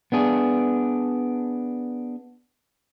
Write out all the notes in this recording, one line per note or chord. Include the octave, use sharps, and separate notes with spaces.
B3 D4 G#4